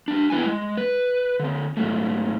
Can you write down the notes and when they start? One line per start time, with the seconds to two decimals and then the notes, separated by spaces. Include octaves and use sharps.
0.08 G#3 D4
0.30 B3 E4 B4 G5 G#5
0.46 G#3
0.77 B4
1.40 D3 C4
1.77 G#2 F#3 A3